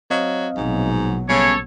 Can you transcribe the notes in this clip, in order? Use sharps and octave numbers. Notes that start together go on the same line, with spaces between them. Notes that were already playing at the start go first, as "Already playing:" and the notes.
F#3 C4 D#5 F5
A#1 G#2 B2 F#3
C#3 G3 B3 C#4 A4 C#5